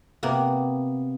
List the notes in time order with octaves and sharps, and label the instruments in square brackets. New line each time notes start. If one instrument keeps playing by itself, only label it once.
[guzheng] C3 A#3 B3